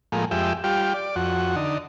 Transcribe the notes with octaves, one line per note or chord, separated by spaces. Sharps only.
A2 F3 G#3 A#3
F2 G#3 G4 E5
G3 F4 G4
D5
F2 F#4
D3 D#4